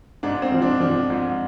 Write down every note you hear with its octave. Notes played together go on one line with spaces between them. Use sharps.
G#2 D4
C4
F3
D4
F3 D4
G#2